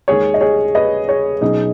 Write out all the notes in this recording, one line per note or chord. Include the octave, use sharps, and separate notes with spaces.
D#2 D#3 G#3 G#4 C#5
D#5
G#4 C#5
B4 D#5
G#4 C#5
B2 F#3 C#4 D#4 G#4